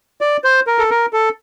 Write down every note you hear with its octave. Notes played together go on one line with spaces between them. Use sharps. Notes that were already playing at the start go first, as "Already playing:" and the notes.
D5
C5
A#4
A4
A#4
A4